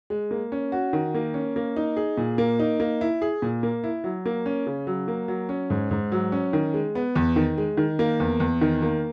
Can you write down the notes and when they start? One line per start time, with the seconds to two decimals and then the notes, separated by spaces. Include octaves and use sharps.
0.10 G#3
0.31 A#3
0.52 C#4
0.72 F#4
0.93 D#3
1.15 A#3
1.34 C#4
1.56 A#3
1.76 D#4
1.96 G#4
2.17 A#2
2.38 A#3
2.60 D#4
2.80 A#3
3.01 E4
3.22 G#4
3.42 A#2
3.63 A#3
3.84 E4
4.04 F#3
4.26 A#3
4.46 C#4
4.66 C#3
4.87 F#3
5.08 A#3
5.28 F#3
5.49 C#4
5.70 G#2
5.91 G#2
6.12 F#3
6.32 C#4
6.53 D#3
6.74 G#3
6.95 B3
7.15 E2
7.36 D#3
7.58 G#3
7.77 D#3
7.99 A#3
8.20 E2
8.40 E2
8.61 D#3
8.82 A#3